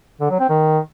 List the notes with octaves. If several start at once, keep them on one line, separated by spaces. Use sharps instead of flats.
D3
F#3
C4
D#3